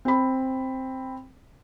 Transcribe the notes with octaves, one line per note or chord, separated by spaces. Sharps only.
C4 B5